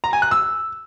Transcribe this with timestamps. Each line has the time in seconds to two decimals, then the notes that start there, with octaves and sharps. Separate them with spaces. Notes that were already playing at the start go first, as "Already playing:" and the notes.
0.04 A#5
0.13 G#5
0.22 F#6
0.31 E6